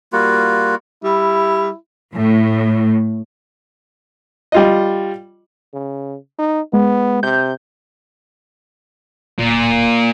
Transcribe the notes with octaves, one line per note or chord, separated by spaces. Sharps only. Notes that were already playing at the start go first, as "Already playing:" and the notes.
G3 A#3 F4 F#4
G3 E4
A2
G3 F4 D#5
C#3
D#4
G#3 B3
C3 G6
D1 A#2